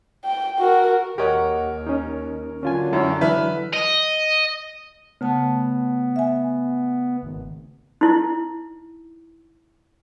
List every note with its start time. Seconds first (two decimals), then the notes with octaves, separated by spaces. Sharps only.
0.25 G5
0.59 F#4 A#4
1.18 D#2 G4 A#4 C#5 D#5 F#5
1.87 C#4 D#4
2.63 D3 F#3 C#4 F4 G#5
2.93 F#2 C#4 E4
3.21 E3 D4 E4 B4 E5 F6
3.73 D#5
5.21 C#3 A3 B3 A5
6.16 E5 G#5
7.23 G#1
8.01 D#4 E4